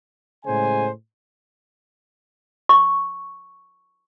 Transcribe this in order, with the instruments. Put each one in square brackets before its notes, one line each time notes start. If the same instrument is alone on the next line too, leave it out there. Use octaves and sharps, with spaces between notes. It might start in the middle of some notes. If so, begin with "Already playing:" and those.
[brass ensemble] A2 C#3 G#3 C5 G#5
[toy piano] C#6